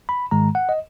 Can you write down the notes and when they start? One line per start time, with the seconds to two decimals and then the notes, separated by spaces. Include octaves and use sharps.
0.09 B5
0.31 G#2 D#3 G#3 A#5
0.55 F#5
0.69 D#5